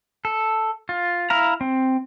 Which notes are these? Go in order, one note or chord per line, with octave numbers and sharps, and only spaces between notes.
A4
F4
E4 F5 A#5
C4